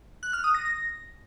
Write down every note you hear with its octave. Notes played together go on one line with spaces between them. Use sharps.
F#6
F6
D#6
A#6
A#6